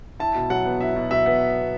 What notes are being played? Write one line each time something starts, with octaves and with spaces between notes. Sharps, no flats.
E4 A5
B2
F#3 F#5
B3
E4 E5
B2
F#3 E5
B3